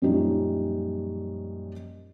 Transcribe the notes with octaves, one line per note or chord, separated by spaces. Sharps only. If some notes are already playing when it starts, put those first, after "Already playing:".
F#2 A#2 F3 G3 C#4 D#4